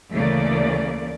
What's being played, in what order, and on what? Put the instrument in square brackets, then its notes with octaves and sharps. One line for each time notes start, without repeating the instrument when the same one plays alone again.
[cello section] D2 C#3 E3 A3 A#3 D5